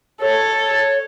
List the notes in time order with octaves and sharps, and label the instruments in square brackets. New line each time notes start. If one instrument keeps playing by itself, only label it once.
[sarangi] A4 [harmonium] C#5